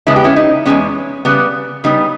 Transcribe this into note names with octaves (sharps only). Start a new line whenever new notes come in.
E2 C#3 G#3 B3 E4
G4
C#4 E4
D#4
E2 C#3 G#3 B3 C#4
C#3 G3 B3
C#3 G3 B3 D#4